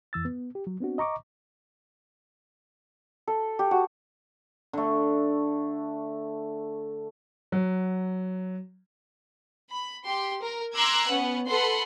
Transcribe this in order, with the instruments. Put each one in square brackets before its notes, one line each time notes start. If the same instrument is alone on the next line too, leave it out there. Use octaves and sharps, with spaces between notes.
[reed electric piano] F2 E3 E6 A6
B3
G4
F#3
B3 C4 D4 F#4
D#5 A#5 C#6 D6
[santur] A4
G4
F#4
[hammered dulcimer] D3 A3
[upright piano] F#3
[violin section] B5
G4 C6
A#4
A#5 C6 D6 E6 F#6 G#6
B3 C#4 F#5
A4 B4 F#5 B5 C6